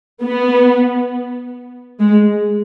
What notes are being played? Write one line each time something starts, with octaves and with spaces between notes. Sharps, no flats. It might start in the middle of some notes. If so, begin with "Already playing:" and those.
B3
G#3